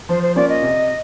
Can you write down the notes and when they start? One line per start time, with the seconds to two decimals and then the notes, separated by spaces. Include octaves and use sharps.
0.09 F3 C5
0.22 C5
0.35 A#3 C#4 F4 D5
0.49 D#5
0.62 C3